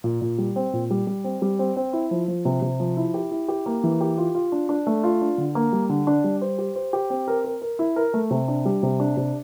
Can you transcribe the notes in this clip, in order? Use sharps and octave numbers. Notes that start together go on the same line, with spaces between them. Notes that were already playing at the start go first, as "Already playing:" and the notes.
A#2
A#2
G3
C4
A#2
G3
G3
C4
G3
C4
C4
E4
F3
F3
C3
C3
F3
E4
G4
E4
G4
A#3
E3
G4
F4
F4
D4
D4
A3
F4
D4
D3
A#3
G3
D3
D4
G3
C5
G4
C5
G4
C4
A#4
A#4
A#4
E4
A#4
A3
C3
D4
G3
C3
D4
C3